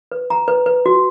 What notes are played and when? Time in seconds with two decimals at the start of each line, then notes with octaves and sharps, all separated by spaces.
0.12 B4
0.30 A#5
0.48 B4
0.66 B4
0.86 F#4